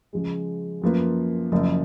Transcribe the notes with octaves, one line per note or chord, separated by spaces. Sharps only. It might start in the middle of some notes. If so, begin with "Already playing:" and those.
C#3 F3 G#3
F#2 F3 A#3 F4 B4
F#1 F#2 F3